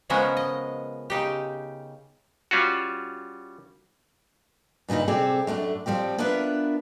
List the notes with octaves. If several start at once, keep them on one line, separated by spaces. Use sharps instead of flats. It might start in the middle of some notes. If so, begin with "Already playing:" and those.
C#3 F3 G#3 B3 C#4 A#4
D#5
C#3 D#4 G4
G3 C#4 F4 F#4
G2 A#2 C#3 D#4 E4
C3 G3 C4 G#4 A4
F#2 A3 B3 D4
F3 G3 C4 G4
B3 D4 F4 A#4 B4 E5